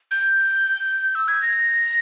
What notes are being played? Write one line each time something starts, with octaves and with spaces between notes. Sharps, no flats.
G6
E6
G#6
A#6